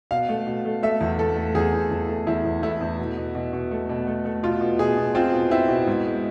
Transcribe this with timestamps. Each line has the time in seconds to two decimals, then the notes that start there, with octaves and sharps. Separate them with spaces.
0.11 B2 F5
0.29 A3
0.47 B2
0.65 A3
0.83 A3 E5
1.01 E2
1.19 A3 A4
1.36 A3
1.55 E2 G#4
1.73 E2
1.91 E2
2.09 A3
2.27 E2 E4
2.44 E2
2.63 A3 E4
2.81 E2
2.99 B2
3.17 B2
3.35 B2
3.53 B2
3.71 A3
3.89 B2
4.07 A3
4.25 A3
4.43 B2 F4
4.61 B2
4.79 B2 G#4
4.97 B2
5.15 C4 F4
5.33 B2
5.51 C4 E4
5.69 B2
5.87 G#2
6.05 G#3